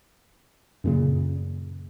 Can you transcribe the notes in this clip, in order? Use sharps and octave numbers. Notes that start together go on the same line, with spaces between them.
F#2 A#2 C#3